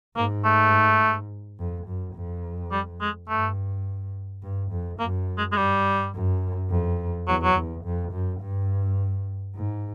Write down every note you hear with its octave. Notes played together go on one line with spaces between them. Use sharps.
G#2 A#3
A3
F2
F#2
F2
G3
G#3
G2 A3
G2
F2
F#2 A#3
G#3
G#3
G2 G3
F#2
F2
E2 F#3
F#3
E2
F2
F#2
G2
G#2